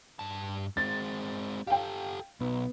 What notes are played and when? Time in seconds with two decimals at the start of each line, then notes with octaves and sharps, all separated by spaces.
0.19 G2 A5
0.77 G#3 C4 A6
1.67 G4 A4 F5 G5
2.40 B1 B3